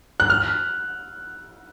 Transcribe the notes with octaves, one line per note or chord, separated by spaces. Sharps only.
F#6
F6